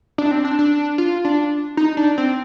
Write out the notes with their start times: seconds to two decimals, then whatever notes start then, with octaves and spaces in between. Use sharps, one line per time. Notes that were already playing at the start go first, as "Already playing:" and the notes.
0.18 D4
0.31 C4
0.45 D4
0.59 D4
0.98 F4
1.25 D4
1.77 D#4
1.97 D4
2.18 C4